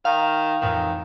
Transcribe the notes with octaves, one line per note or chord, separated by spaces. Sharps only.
D#3 F5
F2 A2 D#3 E3